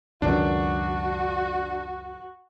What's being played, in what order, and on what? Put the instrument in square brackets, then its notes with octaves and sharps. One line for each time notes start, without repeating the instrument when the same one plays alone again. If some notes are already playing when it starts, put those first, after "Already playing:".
[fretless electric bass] C#2 F#2 D#3 [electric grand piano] D4 [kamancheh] F#4